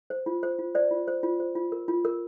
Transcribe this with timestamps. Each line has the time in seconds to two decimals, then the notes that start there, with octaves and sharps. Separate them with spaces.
0.10 C5
0.26 F4
0.43 C5
0.59 F4
0.75 C5 D5
0.91 F4
1.08 C5
1.23 F4
1.40 C5
1.55 F4
1.72 A#4
1.88 F4
2.05 A#4